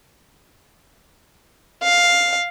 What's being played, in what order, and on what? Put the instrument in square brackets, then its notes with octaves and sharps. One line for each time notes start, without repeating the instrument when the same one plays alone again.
[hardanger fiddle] F5